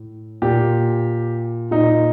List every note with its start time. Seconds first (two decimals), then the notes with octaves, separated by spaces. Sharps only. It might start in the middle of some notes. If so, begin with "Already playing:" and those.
Already playing: A2
0.42 A#2 G4
1.71 A#2 D#4